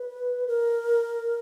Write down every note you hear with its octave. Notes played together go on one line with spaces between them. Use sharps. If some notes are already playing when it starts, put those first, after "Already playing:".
Already playing: B4
A#4